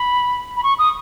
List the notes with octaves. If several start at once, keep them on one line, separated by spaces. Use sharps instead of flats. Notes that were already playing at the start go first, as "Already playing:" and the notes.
Already playing: B5
B5
C#6
D#6